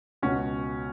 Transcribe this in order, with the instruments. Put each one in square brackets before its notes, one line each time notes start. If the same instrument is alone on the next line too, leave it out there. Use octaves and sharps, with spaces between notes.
[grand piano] C#2 B2 C#4 F#4